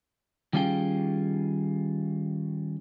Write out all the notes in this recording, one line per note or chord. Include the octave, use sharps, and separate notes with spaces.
D#3 G3 C#4 F4 G#4 G5